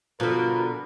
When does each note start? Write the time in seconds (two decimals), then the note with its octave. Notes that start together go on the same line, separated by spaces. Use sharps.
0.20 B2 D3 F3 A#4